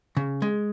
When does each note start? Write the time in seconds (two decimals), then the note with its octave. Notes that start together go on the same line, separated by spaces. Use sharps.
0.17 C#3
0.42 G#3